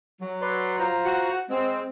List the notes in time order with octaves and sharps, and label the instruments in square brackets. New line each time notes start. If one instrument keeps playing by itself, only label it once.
[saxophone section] F#3
[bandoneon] B4 D5 C6
F4 C5 A#5
[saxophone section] F#4
[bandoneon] G#3 [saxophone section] C4